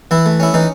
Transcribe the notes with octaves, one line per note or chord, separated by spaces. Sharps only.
E3 E4
A3
C#4 E4
E3 D#4